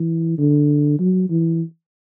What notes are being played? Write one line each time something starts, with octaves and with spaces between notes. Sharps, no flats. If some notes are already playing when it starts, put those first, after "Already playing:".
Already playing: E3
D3
F#3
E3